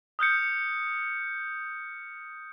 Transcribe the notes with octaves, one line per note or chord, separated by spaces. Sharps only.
D#6 F6 G6 C#7